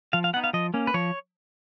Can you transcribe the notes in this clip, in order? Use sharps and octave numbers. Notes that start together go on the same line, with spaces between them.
F3 F5
F5
B3 D#4 F#5
F5
F3 D#5
A#3 C#4
B4
F3 C#5